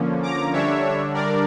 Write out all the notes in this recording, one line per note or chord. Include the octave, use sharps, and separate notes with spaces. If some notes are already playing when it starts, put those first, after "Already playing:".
Already playing: D3 F3 A#3 C#4
A#5 D6
D3 G3 D4 C#5 E5
A#4 D5